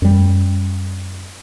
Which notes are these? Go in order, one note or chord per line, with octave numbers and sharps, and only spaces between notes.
F#2 G3